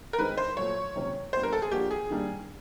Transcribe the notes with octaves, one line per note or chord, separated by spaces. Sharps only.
A#4
D#3 G#3 C4 D#4 B4
C5
A#2 F#3 A3 C#5
C3 D#3 F#3 A#3 C#4
A#2 G3 B3 D4 C5
A#4
A4
G#4
F3 A#3 D4 F#4 G4 A#4
G#4
D#3 G3 A#3 D4